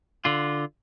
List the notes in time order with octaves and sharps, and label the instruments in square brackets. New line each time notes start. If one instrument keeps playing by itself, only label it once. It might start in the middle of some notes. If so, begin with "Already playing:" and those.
[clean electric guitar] D3 F4